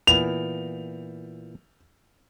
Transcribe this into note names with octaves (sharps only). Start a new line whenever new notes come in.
A#2 E3 B3 F7